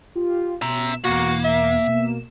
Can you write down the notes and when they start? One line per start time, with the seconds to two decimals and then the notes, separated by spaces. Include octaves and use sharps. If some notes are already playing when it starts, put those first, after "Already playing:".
0.15 F4 G4
0.62 B2 E5 A#5
1.04 E2 B2 A#3 F#4
1.44 E5
1.87 B2 A#3 E7